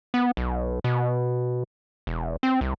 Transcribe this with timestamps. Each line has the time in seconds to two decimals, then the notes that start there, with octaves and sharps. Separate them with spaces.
0.14 B3
0.37 B1
0.84 B2
2.07 E1
2.43 C4
2.61 C2